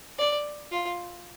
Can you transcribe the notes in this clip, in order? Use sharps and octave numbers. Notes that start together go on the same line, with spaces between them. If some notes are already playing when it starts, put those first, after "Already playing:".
D5
F4